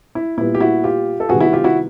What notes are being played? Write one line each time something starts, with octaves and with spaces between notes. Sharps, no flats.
E4
A#2 G3 B3 E4
G4
E4 F#4
F4 G4
A4
C3 D#3 G3 B3 F#4 G#4
E4 F#4
F4 G4
E4 F#4